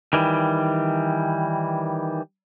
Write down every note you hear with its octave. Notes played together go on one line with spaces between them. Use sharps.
D#3 E3 G3